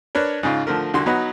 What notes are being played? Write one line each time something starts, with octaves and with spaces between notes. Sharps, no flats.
D4 A#4 B4 C#5
G#2 C#3 F4
D3 F3 A3 A#4
C2 D3 F#4 C6
F#3 B3 D#4 B4 F#5